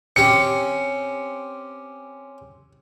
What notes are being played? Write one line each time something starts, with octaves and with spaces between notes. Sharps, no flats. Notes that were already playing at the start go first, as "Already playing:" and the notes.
C4 C#4 G4 C#7